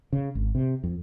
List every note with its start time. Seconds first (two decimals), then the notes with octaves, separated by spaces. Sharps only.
0.13 C#3
0.35 G#1
0.55 C3
0.84 F2